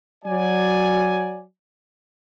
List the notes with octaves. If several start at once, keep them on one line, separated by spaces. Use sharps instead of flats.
F#3 D5 G#5